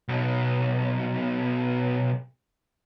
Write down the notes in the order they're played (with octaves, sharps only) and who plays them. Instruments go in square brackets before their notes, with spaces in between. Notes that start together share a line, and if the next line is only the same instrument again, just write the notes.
[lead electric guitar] B1 B2